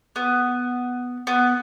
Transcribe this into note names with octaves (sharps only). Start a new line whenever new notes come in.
B3
B3